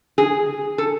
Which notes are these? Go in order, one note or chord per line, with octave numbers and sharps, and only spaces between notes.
G#4
A4